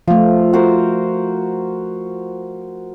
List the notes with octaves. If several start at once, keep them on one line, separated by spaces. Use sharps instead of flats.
F3 A3 F4
F#4 A#4 C5